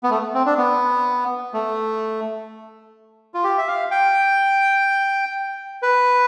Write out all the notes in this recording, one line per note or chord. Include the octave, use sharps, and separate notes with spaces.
B3
A3
C4
D4
B3
A3
F4
G4
E5
F5
G5
B4